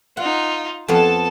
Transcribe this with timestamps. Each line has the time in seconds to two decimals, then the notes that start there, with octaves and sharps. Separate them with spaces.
0.17 D#4 F4 F#5
0.88 F2 B3 A4 F5 A5